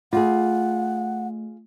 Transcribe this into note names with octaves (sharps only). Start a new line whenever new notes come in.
A3 F4 G#4 F#5